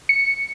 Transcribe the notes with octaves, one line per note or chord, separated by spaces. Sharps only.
C#7